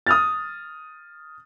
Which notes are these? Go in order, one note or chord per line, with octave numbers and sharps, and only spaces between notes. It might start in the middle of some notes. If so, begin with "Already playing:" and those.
D#6 F6 A6